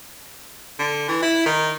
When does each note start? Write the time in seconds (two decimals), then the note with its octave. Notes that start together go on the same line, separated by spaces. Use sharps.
0.79 D3
1.08 E3
1.22 E4
1.46 D#3